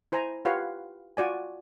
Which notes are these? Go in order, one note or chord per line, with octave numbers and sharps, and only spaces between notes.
E4 C5 G#5 A#5
F4 G4 B4 C#5 F5 F#5
F4 F#4 D5 G#5